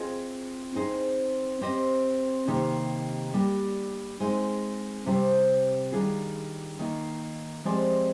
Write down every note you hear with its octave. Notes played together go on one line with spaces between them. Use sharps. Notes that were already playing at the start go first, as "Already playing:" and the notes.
Already playing: C4 F4 G#4 D#5
C4 D#4 G#4 C5
C4 G4 C5 D#5
C3 D#3 A#3 D#4 G4
G3 A#3 D4 G4
G#3 C4 D#4
C3 G3 C4 G4 C5
D#3 G3 D4 F4 G#4
D#3 A#3 D#4
F3 G#3 C4 G4 D5